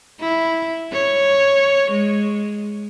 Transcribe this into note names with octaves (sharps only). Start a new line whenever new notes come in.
E4
C#5
G#3